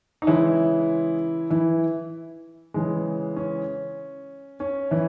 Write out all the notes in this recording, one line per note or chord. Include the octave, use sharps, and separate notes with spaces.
D#4
C#3 E3 G#3 E4
E3 E4
C#3 E3 G#3
C#4
C#4
E3 E4